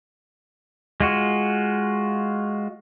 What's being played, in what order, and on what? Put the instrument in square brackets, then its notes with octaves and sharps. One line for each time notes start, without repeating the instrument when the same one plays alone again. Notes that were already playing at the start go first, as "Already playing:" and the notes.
[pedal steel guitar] G#3 F4 F#4